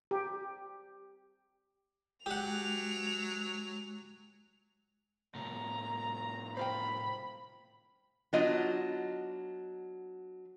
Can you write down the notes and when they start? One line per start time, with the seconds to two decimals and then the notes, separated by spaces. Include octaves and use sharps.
0.11 G4
2.26 F#3 G#3 G4 F#5 F7
5.35 A2 C3 A#5
6.57 C5 F5 G5 B5
8.33 F#3 B3 D4 F4 D#5